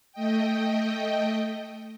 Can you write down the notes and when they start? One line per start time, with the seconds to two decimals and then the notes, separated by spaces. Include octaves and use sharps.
0.13 A3 D#5 G5